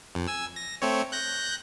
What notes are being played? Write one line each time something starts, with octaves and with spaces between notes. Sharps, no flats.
F2
G#5 E6
A#6
A3 C4 C#5
F#6 G6 A#6